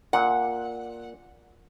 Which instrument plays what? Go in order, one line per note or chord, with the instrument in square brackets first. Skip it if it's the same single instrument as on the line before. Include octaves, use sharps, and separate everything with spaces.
[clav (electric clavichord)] A#2 [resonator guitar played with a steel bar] F#5